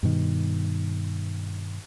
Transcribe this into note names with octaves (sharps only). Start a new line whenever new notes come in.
G2 B2 D#3